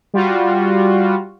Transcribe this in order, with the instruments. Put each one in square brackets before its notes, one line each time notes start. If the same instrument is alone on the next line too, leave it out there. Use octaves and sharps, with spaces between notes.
[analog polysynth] G3 F4 F#4